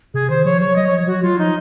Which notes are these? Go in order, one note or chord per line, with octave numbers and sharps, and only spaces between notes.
C3 G#4
D#3 C5
F3 C#5
F#3 C#5
F#3 D#5
F3 C#5
F#3 F#4
F#3 F4
F3 D#4